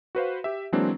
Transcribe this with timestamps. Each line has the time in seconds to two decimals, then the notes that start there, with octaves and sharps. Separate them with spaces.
0.15 F#4 B4 C5 F5
0.44 G4 E5
0.72 E3 F#3 G#3 A#3 C4 D4